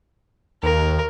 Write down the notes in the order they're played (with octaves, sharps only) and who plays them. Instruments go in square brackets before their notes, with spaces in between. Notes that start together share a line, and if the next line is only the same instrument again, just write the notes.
[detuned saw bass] D#2 [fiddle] A#4